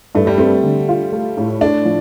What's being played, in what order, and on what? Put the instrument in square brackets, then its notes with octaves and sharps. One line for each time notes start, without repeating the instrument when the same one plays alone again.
[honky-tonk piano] G2 [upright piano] A3
[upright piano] G3
[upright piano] A3 [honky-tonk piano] C4
[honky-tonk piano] D3
F4
A3
A2
[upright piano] D4 [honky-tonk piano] A4
[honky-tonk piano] F3